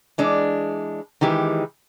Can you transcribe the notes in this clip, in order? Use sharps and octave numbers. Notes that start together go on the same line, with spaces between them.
E3 G#3 D4
D#3 E3 G#3 G4